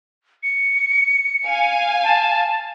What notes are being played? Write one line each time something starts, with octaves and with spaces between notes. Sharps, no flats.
C#7
F5 G#5
A5